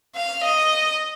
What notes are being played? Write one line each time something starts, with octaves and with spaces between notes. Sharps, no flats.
F5
D#5